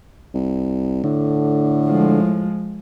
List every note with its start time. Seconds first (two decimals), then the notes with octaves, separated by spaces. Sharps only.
0.34 C2
1.04 A2 D3
1.86 F3 G#3